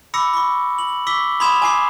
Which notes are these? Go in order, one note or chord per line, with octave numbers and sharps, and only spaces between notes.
B5 D6 E6 A#6 C#7
B5 C#6
F#7
C#6 D6 E6 B6 G7
B5 C6 D#6 G#6 E7 F7
G#5 D6 C7